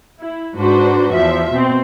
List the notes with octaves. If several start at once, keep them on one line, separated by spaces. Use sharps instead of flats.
E4
G#2 D4 F#4 B4 C5
E2 F3 E5
B2 C4